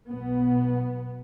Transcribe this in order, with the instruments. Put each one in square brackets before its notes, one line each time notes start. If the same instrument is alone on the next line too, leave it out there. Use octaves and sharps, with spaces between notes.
[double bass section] B1 B2 B3